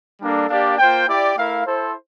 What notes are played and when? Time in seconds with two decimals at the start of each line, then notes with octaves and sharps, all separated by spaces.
0.20 G3 A#3 D4 A4
0.49 A#3 D4 G4 D5 F5
0.78 A#3 F4 C5 G5
1.07 E4 G4 D5 G5
1.36 A3 E4 A#4 F5
1.66 E4 A4 C5